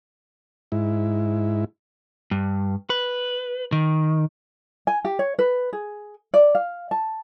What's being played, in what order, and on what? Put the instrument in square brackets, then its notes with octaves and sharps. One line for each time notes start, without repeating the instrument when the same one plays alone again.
[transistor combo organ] G#2 E4
[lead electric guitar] G2
B4
D#3
[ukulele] G#5
G4
C#5
B4
G#4
D5
F5
A5